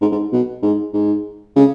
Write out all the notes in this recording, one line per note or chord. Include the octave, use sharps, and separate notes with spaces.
G#2
G#2
B2
G#2
G#2
C#3